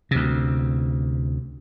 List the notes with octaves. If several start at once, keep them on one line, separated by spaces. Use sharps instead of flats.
D2 C3